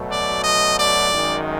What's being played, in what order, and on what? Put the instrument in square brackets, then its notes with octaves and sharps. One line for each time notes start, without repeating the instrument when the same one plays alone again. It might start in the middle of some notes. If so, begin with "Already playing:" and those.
Already playing: [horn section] B2 F#3 A3
D5
D#5
D5
F#2 D#3 G#3